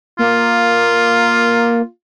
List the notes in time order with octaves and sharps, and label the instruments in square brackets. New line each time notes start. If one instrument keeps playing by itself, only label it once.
[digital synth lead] A#3 [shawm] F4